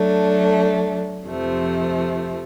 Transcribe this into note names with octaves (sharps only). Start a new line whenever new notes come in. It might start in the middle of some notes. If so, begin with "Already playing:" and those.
Already playing: F#3 A3 D4
F2 C3 F3 A3